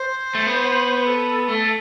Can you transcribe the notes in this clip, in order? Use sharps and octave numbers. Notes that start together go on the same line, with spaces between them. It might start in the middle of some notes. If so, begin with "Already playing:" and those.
Already playing: C5
A3
B3
B4
A4
A3